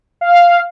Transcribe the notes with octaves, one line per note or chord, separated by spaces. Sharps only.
F5